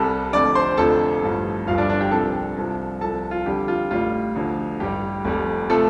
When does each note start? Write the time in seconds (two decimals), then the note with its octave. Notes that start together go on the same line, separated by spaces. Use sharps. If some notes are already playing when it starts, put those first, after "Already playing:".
Already playing: C2 C3 G3 A4 A5
0.33 F1 F2 D3 D5 D6
0.55 C5 C6
0.77 F1 F2 D3 F3 A4 A5
1.23 A1 G2 F3
1.67 G1 G2 F3 F4 F5
1.78 D4 D5
1.89 D4 D5
2.01 G4 G5
2.11 C2 C3 F3 A4 A5
2.57 C2 C3 F3
3.01 C2 C3 F3 A4 A5
3.31 F4
3.46 F2 D3 G3 G4
3.68 F4
3.91 A1 A2 G3 F4
4.36 D2 D3 F3
4.80 A1 G2 G3 G4
5.25 F1 F2 C3 G3
5.70 C3 F3 A3 A4